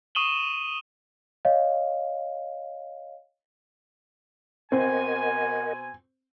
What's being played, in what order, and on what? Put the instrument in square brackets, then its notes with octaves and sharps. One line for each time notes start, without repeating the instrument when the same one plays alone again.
[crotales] C#6 D#6 D#7 E7 F#7 G7
[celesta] C#5 D#5 F5
[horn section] B2 C5 G#5 [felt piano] C4 [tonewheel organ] A#4 D#5 F#5